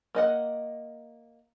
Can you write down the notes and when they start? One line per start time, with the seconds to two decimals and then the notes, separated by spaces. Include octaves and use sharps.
0.15 A#3 D#5 F#5